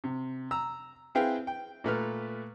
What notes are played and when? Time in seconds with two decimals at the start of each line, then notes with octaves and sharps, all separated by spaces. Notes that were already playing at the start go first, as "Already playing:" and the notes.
0.04 C3
0.51 A#5 E6
1.15 C4 E4 G#4 B4 F5 G5
1.47 G5
1.84 A#2 A3 B4 F6